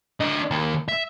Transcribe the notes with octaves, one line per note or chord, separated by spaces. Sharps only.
D3 D#5
D#3 A#3
E5